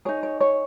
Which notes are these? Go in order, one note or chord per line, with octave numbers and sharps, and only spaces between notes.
D#4 G#4 C#5
C#5
C#5